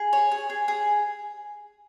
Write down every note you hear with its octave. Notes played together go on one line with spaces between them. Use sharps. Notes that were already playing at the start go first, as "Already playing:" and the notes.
Already playing: G#4
C#5
G#4
G#4
G#4